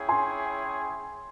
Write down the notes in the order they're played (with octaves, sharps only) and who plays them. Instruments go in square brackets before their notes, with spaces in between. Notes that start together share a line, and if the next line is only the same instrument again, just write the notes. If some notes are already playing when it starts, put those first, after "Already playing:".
Already playing: [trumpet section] C#4 E4 G#4 C#5 G5
[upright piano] G#5 C6